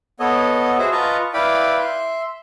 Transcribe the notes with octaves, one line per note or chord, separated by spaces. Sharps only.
B3 A4 C#5 D#5
F#4 G#4 C5 E5
F4 B4 D#5 A5 A#5 C#6
E4 B4 D5 F5 G5 B5
E5 C6